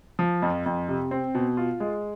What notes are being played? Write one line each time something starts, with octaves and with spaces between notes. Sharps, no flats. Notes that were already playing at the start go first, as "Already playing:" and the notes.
F3
F2
F2
C3
C4
B2
F4
G#3